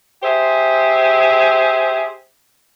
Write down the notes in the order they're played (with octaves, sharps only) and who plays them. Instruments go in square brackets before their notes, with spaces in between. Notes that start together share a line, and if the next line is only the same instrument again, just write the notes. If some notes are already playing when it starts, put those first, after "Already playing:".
[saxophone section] G4 G#4 C5 E5